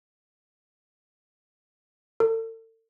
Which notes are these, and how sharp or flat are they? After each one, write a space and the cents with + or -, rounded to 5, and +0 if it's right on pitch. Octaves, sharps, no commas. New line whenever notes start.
A4 +40